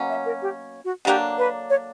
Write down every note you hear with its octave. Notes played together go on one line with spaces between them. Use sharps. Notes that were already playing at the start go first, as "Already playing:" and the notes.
Already playing: B2 F#3 A#3 C#4
E5
A#4
G4
F#4
D3 F#3 A#3 D4 G4
B4
C#5